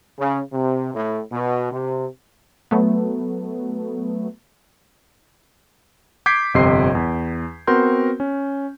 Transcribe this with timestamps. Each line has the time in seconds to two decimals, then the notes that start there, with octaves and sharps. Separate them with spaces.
0.19 C#3
0.53 C3
0.94 A2
1.31 B2
1.71 C3
2.71 F#3 A3 B3
6.26 D6 G6 G#6 B6 C7 D7
6.54 G1 F2 C3 D#5 C6 C7
6.95 E2
7.67 B3 C4 F#4 A#4 C6 G6
8.20 C#4